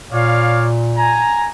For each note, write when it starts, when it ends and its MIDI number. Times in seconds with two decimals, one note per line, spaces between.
0.12 1.31 46
0.12 0.68 73
0.12 0.68 74
0.12 0.68 77
0.97 1.49 80
0.97 1.49 82